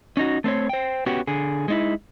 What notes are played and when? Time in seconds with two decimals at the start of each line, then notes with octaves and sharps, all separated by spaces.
0.17 C#4 D#4 F#4
0.44 A3 C4 C5 C#5
0.69 C5 G5
1.06 B3 C#4 F#4 G4
1.27 D3 G#4
1.68 G#3 D#4 E4